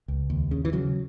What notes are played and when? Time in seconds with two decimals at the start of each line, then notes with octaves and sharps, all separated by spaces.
0.08 C#2
0.30 D#2
0.51 C#3
0.65 E3
0.73 C#3 F#3